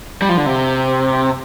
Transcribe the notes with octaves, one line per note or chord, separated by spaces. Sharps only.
G3
F3
D3
C3